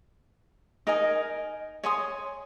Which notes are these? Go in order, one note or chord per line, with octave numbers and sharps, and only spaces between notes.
D#4 A#4 D#5 G#5
C#5 G#5 C6 D#6